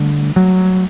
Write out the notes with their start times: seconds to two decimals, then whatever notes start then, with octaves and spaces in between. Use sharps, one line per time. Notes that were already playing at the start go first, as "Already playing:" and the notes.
Already playing: D3 G3 A3
0.36 F#3